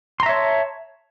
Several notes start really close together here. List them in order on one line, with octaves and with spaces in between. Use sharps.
C6 A#5 E5 C#5 A5